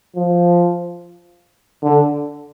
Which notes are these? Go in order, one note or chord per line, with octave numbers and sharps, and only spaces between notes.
F3
D3